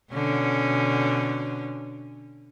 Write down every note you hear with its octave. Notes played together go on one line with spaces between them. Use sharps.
B2 D3 C#4